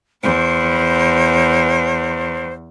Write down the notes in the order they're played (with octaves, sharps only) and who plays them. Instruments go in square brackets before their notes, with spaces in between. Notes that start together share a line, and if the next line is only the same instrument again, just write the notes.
[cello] E2 [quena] C5